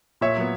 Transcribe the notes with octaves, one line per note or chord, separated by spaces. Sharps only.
A#2 C#5 E5
F#3 B3